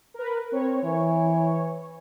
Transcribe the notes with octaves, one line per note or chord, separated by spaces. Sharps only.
A#4 B4
C4 C#5
E3